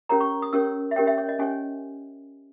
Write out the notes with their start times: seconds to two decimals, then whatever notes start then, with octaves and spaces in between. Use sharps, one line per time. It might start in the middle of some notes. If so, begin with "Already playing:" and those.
0.09 C#4 G4 A#4 C#5 A#5
0.21 C#6
0.42 D#6
0.53 C#4 G4 A#4 C#5 E6
0.91 E5
0.96 C#4 G4 A#4 C#5 G5
1.07 E5
1.18 C#5
1.29 D#5
1.39 C#4 G4 C#5 G#5